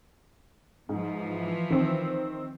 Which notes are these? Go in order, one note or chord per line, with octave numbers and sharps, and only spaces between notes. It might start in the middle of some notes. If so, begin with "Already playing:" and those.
G#2 E3 F3
D#3 C4